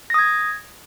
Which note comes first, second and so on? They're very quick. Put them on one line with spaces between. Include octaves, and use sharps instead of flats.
A#6 D#6 G#6